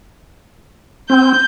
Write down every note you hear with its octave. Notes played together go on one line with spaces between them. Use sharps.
C4 G6